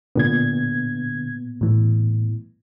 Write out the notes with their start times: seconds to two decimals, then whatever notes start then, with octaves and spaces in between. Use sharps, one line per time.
0.16 A#2 D3 B3 G#6
1.61 A2 E3